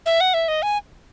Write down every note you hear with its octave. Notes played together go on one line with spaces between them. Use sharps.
E5
F#5
E5
D#5
G#5